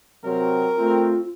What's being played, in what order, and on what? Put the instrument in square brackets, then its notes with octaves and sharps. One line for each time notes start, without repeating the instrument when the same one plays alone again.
[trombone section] C3 F#3 C4 [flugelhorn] A#4
[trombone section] A3 C4 [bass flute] F4